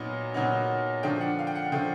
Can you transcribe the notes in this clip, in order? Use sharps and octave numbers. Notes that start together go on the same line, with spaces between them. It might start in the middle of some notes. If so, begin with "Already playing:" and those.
Already playing: A#2 F#3 B3 D#4
A#2 F#3 B3 D#4
D3 F3 A3 D4 G5
F#5
F5
G5
F#5
D3 F3 A3 D4 G5